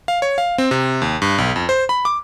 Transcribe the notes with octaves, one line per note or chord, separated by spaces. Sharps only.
F5
C#5
F5
C4
C3
D#2
G2
B1
F2
C5
B5
D6